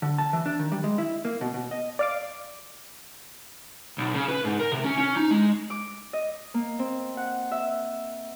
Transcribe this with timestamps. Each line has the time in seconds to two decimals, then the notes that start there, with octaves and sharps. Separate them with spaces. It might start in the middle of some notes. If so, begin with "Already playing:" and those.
0.02 D3
0.18 A5
0.33 E3
0.46 D4
0.59 D#3
0.72 G3
0.84 G#3
0.98 E4
1.25 A#3
1.41 B2
1.54 B2
1.71 D#5
1.99 D5 F5 D6
3.98 B1
4.14 C#3
4.29 B4
4.45 G#2
4.60 A#4
4.72 C3
4.84 C#4
4.98 C#4
5.16 D#4
5.31 G#3
5.70 D6
6.13 D#5
6.54 A#3
6.79 C4
7.17 F#5
7.52 E5